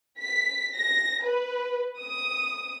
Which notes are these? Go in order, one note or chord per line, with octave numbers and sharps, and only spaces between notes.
B6
A#6
B4
D#6